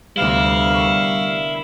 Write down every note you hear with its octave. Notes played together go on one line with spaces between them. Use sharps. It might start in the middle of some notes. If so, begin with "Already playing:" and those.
D2 C3 G3 B3 E4 F5
A#4 C#6